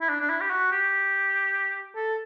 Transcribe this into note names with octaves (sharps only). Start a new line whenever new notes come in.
E4
D4
D4
E4
G4
F#4
G4
A4